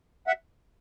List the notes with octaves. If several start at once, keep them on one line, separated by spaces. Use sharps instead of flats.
E5 F#5